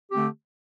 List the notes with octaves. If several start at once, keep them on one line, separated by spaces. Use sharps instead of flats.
D3 A3 C4 G4